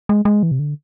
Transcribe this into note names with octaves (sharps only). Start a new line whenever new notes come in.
G#3
G#3
E3
C3
D3